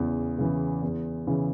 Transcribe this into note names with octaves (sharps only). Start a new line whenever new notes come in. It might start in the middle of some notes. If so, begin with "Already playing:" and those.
Already playing: E2 C#3 E3
C#3 E3
E2
C#3 E3